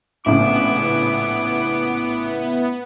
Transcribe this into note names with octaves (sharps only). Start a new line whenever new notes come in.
A#1 A2 C#3 B3 E4 D6